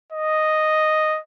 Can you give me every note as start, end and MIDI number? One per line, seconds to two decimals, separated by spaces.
0.12 1.19 75